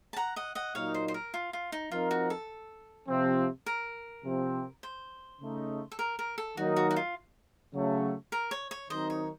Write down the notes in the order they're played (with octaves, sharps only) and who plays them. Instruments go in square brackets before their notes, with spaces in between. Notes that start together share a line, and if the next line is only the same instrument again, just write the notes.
[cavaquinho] A5
F#5 A#5
D#5 F#5
D#5 F#5
[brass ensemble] A#2 F#3 A#3 D#4 [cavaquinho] C#5 F5
[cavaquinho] C5
C5
A#4
F4
F4
D#4
[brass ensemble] F3 C4 D#4 A#4 [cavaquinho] F4
[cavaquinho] F#4
A4
[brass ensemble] C3 F3 C4
[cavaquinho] A#4
[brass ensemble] C3 F3 C4
[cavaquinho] C5
[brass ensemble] C#3 A3 D#4
[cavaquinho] A4
A#4
A#4
A4
[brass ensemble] D#3 F#3 A#3 D#4 A#4 [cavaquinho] F#4
[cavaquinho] F#4
F#4
F4
[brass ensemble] C#3 F#3 A3
[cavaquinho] A#4
C#5
C#5
[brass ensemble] D#3 F#3 C4 D#4 A#4 [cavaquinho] C5 D#5
[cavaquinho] C#5